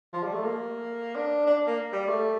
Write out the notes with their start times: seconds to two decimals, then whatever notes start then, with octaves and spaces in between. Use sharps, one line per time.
0.13 F3
0.23 G3
0.33 A3
0.44 A#3
1.15 D4
1.46 D4
1.67 A#3
1.92 G3
2.08 A3